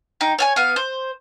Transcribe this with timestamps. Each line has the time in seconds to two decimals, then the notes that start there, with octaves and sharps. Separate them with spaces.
0.21 D#4 G5
0.38 C#5 F5 G#5
0.56 B3 F5
0.76 C5